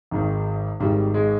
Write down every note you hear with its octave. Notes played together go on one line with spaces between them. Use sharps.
G#1 G#2 D#3
G#1 G#2 D#3 G3
G#3